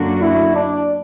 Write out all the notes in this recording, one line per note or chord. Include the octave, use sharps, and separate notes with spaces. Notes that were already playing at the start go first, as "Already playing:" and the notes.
Already playing: F#2 D3 A#3 D4 F#4
E4
D4